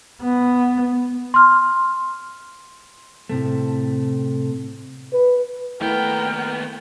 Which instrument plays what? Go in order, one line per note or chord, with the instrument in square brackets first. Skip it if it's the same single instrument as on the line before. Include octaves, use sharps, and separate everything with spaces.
[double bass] B3
[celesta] C6 F6
[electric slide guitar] A2 C3 A3
[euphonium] B4
[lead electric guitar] D#2 B3 [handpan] A3 E4 B4 [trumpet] A#4 [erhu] G5